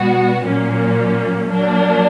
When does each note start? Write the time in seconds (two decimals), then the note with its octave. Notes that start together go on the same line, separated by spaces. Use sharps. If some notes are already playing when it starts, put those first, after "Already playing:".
Already playing: B2 G3 B3 F#4
0.45 A#2 F#3 A#3 C#4
1.48 F#3 A#3 D4